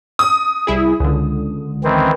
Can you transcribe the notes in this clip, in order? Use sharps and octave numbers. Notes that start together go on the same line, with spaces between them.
D#6
C2 E4 G#4
C#2 D3
D#3 E3 C4